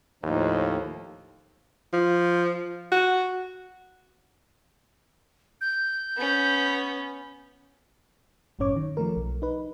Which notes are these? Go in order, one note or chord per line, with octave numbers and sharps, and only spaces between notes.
D#2 A2 F3 D#4
F3
F#4
G6
B3 C#4
G1 F#2 A2 C#4 C#5 D6
D#3
F3 A3 A#4
B1
D#4 B4